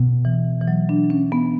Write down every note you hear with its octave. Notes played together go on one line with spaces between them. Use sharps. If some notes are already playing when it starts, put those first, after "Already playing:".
Already playing: B2
E3
E3
F#3
D4
C#4
B3